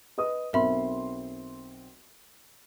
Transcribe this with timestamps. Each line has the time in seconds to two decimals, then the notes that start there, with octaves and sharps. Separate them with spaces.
0.18 B4 D#5 D#6
0.53 B1 C4 A#4 E5 B5 C6